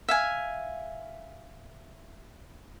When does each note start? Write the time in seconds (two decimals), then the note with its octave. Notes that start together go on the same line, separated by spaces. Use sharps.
0.09 E5 F5 G#5